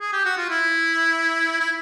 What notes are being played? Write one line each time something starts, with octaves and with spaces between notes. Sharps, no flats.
G#4
G4
F#4
F4
E4
E4